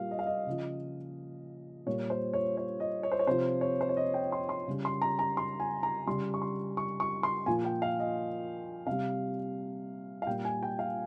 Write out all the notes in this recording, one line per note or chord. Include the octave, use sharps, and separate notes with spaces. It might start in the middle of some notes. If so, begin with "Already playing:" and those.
Already playing: A#2 G3 F5
D#5
F5
D#5
C#3 F3
A#2 G3 C#5
C5
C#5
C#5
D#5
C#5
C5
C#5
C3 F3 C5
C#5
C5
C#5
D#5
G5
C6
C6
C#3 G3
C6
A#5
A#5
C6
G#5
A#5
C#3 G3 C6
C#6
C6
C#6
C#6
C6
A#2 F3 G#5
G5
F5
D#5
C3 G3 F5
F5
A#2 G3 G5
G#5
G5
F5